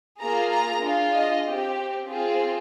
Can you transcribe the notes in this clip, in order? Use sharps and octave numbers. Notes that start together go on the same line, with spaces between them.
A#3 F4 G#4 A#5
A#5
D4 F4 G#4
D#5
C4 G4
C4 F4 G#4